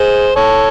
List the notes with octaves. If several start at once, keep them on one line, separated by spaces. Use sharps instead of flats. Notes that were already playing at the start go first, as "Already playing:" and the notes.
Already playing: G#4 C5
A4 C#5